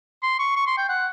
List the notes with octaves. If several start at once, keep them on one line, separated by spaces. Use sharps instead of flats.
C6
C#6
C#6
C6
G5
F#5